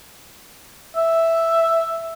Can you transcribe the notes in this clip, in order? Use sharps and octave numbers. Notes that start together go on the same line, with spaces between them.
E5